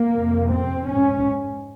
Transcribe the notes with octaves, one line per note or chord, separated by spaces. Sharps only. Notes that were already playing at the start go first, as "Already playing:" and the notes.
Already playing: A#3
F2 C3
C4
G#2 C#4